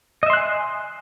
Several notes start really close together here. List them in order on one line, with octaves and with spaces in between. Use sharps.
D#5 E5 C6 F#6 G#5